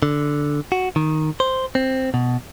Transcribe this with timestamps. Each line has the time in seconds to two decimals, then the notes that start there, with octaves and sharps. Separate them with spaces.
0.03 D3
0.72 F#4
0.96 D#3
1.40 C5
1.75 C4
2.14 B2